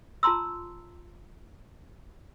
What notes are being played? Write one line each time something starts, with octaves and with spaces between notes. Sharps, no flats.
F4 A5 A#5 C6 E6